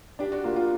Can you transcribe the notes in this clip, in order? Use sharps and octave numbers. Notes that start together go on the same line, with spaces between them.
D4 G4
F#4
A#3 F4
F4